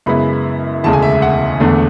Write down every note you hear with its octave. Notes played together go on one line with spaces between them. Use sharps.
F#2 C#3 G#3 B3 E4 B5
E1 D2 C#3 G#3 A5
G#5
E5
E5
F#5
E1 E2 D3 A3 D4